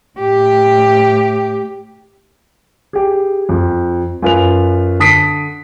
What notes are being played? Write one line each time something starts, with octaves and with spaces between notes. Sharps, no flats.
A2 G4
G4 G#4
F2
F#2 F4 B4 F7
D3 A5 D#6 B6 C7 D7